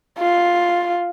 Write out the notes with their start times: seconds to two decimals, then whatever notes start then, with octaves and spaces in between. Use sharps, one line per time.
0.19 F4